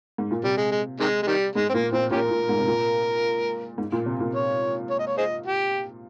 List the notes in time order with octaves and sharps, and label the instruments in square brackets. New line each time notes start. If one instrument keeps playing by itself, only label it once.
[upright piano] G#2
A#2
[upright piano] C3 [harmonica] G3
[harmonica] G#3
G#3
C3 D#3 G#3
G#3
D#3 G3
[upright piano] G#2 [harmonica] G#3
[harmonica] C4
[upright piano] A#2 [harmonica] A#3
[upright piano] A#2 [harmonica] C4
[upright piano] A#2 [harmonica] C#4 G4 A#4
[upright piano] A#2
G#2
C3
A#2
G#2
A#2
C3
A#2
[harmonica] C#5
C#5
D#5
C#5
G#4 C5 D#5
G4